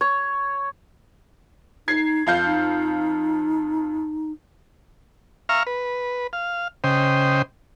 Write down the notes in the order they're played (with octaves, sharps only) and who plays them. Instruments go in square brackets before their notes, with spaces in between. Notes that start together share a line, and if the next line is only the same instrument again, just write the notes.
[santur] C#5
[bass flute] D#4 [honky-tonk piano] G#6 C7
[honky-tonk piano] F2 F5 G6
[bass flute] D#4
[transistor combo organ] E5 F5 A#5 C#6 F6
B4
F5
C#3 C5 D#5 G5